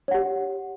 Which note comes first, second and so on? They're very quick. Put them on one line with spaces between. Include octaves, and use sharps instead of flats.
C#5 F#5 G4